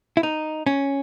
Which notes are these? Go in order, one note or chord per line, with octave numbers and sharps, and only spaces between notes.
E4
D#4
C#4